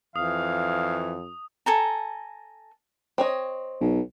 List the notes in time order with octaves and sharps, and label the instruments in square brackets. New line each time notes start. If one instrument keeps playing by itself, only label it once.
[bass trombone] F2 [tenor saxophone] E3 [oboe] F5 [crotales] D#6
[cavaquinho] A4 G#5 A#5
[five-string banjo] C4 C#5 D#5
[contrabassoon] B1